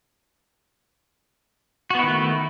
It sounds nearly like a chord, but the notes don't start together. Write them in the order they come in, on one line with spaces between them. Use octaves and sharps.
F#4 B3 E4 D#3 A3